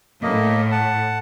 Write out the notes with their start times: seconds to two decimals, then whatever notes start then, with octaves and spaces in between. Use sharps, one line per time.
0.23 A2 A#3 D#5
0.72 F#5 A5